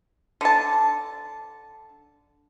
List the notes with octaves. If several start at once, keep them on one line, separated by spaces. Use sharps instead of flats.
D3 A5